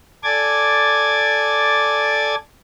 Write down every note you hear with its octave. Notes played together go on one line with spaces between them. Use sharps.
A4 D5 G#5 D6 G#6 A6